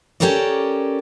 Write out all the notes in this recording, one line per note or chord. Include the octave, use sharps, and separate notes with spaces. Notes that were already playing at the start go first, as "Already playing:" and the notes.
C#4 G4 A4 A#4 C#5 D5